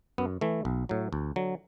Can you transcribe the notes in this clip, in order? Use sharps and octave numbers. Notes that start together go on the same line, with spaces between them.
F#2 B3
E3 A3
B1
A2 F#3
D2
D3 F#3